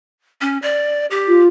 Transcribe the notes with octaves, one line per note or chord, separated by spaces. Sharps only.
C#4
D5
G4
F4